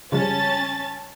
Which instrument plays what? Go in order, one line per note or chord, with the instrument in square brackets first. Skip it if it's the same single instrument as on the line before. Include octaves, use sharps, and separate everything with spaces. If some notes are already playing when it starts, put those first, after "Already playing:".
[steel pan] C#3 F3 G3 [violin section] C#4 A5 A6